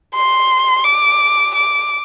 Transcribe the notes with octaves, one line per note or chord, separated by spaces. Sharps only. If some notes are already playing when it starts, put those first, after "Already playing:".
C6
D6
D6